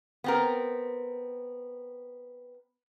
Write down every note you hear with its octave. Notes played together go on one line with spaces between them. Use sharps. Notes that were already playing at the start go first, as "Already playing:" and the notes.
B3 C4 A#4